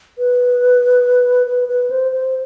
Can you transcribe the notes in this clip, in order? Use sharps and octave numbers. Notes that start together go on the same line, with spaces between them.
B4
B4
B4
C5
C5